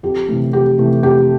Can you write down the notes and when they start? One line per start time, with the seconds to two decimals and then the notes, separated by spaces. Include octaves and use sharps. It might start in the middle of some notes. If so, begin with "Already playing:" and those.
0.03 F2 G4
0.28 C3 E3 A3
0.53 F2 G4
0.78 C3 E3 A3
1.03 F2 G4